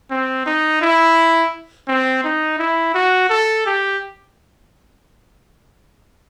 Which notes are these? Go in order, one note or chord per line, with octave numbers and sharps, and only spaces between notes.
C4
D#4
E4
C4
D#4
E4
F#4
A4
G4